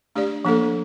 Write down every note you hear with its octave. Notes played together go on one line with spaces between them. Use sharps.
A3 D4 G4 D5
F3 A#3 D4 A4